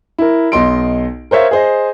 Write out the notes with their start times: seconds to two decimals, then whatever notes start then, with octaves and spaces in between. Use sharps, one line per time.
0.18 E4 A#4
0.52 B1 D#5 C6 D7
1.31 A#4 C5 C#5 E5 F5
1.51 G#4 C5 D#5